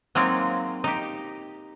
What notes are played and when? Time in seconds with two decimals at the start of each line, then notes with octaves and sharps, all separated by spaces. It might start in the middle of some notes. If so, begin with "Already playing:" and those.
0.15 F#3 G#3 A#3 C4 D#4 F4
0.84 D#4 G4